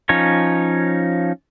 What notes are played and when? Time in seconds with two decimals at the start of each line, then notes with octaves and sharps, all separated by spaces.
0.09 F3 C#4 D#4 C#5